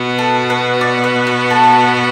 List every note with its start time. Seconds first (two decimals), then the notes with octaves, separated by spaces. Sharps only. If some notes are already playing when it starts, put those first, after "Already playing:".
Already playing: B2 B3 F#4
0.19 A4
0.50 B4
0.81 D5
1.04 B4
1.27 B4
1.50 A4